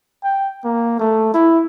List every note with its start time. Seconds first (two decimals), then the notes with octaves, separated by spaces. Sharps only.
0.24 G5
0.64 A#3
0.99 A3
1.34 E4